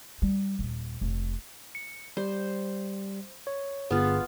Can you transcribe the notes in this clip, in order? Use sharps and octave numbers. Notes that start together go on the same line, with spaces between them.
G3
D#1
F1
C#7
G3 C5
C#5
G1 B3 F4 G#4